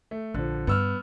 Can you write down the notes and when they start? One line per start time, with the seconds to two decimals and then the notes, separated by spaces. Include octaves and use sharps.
0.11 A3
0.34 A#1 D3 F3
0.67 G2 B3 E6 F6